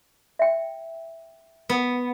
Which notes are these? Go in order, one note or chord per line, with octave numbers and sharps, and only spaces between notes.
E5 G5
B3